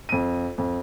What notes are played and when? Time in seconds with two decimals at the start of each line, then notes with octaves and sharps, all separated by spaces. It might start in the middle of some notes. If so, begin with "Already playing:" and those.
0.09 F2 D#7
0.58 F2